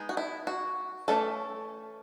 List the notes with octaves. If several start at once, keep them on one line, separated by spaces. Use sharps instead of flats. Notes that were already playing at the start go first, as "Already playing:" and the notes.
Already playing: G#3 B3 D#4
F#4
E4
F#4
E3 A3 C#4 A4